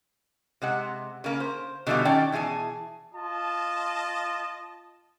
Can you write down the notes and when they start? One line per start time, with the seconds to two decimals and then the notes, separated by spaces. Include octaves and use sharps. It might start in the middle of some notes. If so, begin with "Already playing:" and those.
0.62 C3 G#3 F#5
1.24 C#3 A#3
1.40 C5
1.87 B2 D3 E3 F3 G3 F4
2.05 D#3 C#4 D5 G5 A5
2.32 B2 E3 G#4 G#5 A5
3.14 F4 D#5 A5